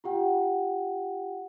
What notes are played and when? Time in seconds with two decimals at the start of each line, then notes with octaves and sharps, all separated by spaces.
0.04 F4 G4 F#5 G5